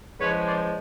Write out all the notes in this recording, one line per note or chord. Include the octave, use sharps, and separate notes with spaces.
E2 C#3 F3 G#3 B4 C#5
C5 D5